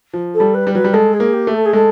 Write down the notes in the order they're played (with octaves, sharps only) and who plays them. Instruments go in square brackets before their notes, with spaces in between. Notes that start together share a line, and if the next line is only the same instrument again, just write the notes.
[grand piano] F3
[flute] A4
[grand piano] G3
[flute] B4
[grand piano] G3
[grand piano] F#3 [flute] B4
[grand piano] G3
[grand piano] G#3 [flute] A4
[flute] G#4
[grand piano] A#3
[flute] G4
[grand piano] A3
[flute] A4
G#4
[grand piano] G#3 [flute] A4